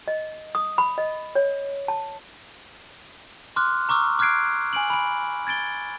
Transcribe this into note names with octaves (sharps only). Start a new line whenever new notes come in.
D#5
D#6
B5
D#5
C#5
A5
C6 D6 F6 F#6
A#5 C#6 D6 E6 F6
D6 F6 F#6 G#6 C7 D7
G#5 D7 F#7
B5 D7
G#6 A6 D7 G7